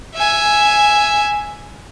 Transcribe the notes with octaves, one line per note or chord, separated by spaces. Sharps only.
E5 G#5